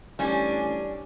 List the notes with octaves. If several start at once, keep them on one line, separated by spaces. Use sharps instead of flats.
A1 G3 C#4 D4 G#5